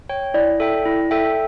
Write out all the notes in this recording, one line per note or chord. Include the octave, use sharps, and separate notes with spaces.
C#5 G5
E4 D5
A4 E5 G5
E4
A4 E5 G5